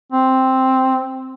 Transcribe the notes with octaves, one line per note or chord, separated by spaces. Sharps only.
C4